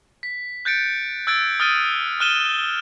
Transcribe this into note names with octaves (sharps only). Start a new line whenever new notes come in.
B6
F#6 G6 A6 C#7 D7
E6 F#6 G#6 A6 D7
D#6 F6 A6 D7 D#7
F6 F#6 D#7 E7 G7